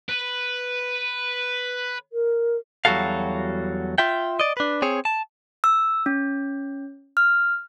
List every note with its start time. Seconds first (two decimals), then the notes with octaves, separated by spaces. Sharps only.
0.09 B4
2.12 A#4
2.85 E2 F#3 G3 F#4 A4 F5
3.98 F4 E5 G5
4.40 D5 D#5
4.57 D4 B4
4.82 C4 G#4 C#5
5.05 A5
5.64 E6
6.06 C#4
7.17 F6